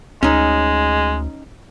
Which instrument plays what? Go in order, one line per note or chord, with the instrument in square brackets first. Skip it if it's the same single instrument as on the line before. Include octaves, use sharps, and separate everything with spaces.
[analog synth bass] D2 [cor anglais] G#3 [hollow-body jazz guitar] C#4 D#4